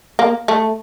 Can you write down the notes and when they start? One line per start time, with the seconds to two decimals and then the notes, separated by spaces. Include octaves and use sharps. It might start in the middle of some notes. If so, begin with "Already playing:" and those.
0.19 A#3
0.48 A3